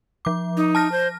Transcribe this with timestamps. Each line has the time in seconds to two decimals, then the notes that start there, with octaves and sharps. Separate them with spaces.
0.25 F3 D6
0.57 D#4
0.75 A5 F6 A#6
0.92 C5